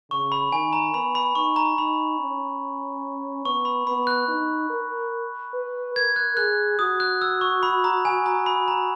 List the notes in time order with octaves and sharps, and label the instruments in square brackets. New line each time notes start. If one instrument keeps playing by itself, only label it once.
[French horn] C#3 [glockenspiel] C#6
[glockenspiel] B5
[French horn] D#3 [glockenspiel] G#5
[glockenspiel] A#5
[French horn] B3 [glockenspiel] B5
[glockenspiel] B5
[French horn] D#4 [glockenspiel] C#6
[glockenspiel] A#5
[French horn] D#4 [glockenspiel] B5
[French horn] C#4
[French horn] B3 [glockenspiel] C#6
[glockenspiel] B5
[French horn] B3 [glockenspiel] B5
[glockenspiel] F#6
[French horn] D#4
A#4
B4
[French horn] A#4 [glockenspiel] G#6
[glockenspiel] F#6
[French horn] G#4 [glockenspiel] F#6
[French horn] F#4 [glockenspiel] D#6
[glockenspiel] F#6
E6
C#6
B5
A#5
G#5
A#5
B5
A#5